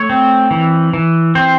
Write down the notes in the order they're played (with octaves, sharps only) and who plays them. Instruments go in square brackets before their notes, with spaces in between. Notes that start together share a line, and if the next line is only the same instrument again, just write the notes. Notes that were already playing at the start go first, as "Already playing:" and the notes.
Already playing: [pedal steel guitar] A3 C#5
C4
E3
E3
C4 C5